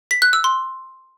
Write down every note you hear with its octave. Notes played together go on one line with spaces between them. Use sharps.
B6
F#6
E6
C6